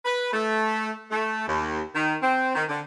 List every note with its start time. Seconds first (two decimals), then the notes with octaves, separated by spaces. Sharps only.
0.05 B4
0.33 A3
1.11 A3
1.47 D#2
1.95 D#3
2.22 C4
2.55 D#3
2.69 D3